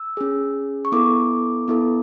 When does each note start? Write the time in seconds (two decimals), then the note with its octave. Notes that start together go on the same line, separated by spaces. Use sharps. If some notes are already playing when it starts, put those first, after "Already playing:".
Already playing: E6
0.17 C#4 G#4
0.85 C#6
0.92 B3 E4 A4 D6
1.68 B3 E4 A4